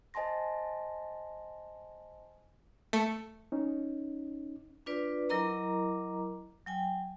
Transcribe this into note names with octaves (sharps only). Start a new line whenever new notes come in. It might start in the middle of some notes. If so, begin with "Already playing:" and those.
C5 D#5 G#5 A5 C6 A#6
A3 C#7
C#4 D#4
D4 F4 B4 D5
F#3 E4 A#4 D#5 A#5 D6
F#3 G5 G#5